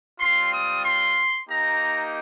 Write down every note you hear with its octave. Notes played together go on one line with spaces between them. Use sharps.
G3 C4 F4 C6
D#6
C6
A#3 D#4 G4 A#5